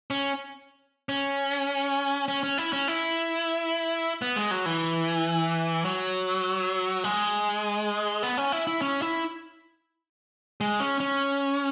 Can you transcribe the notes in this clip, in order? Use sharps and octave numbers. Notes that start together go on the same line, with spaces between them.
C#4
C#4
C#4
C#4
E4
C#4
E4
B3
G#3
F#3
E3
F#3
G#3
B3
C#4
E4
E4
C#4
E4
G#3
C#4
C#4